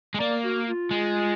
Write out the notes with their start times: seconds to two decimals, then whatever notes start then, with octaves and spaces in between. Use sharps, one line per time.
0.14 G#3
0.20 A#3 D5
0.44 F#4
0.68 F4
0.91 G#3